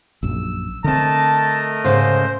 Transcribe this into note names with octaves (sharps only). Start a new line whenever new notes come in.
A#1 F#2 E6
D3 A3 C4 A#4 D#5 A5
G#2 C#3 C5